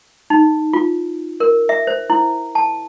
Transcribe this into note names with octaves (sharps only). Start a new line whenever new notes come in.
D#4
F4
A#4
E5
C5
E4
A5